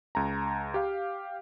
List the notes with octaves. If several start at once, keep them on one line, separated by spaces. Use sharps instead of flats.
C#2 A#5
G4 F5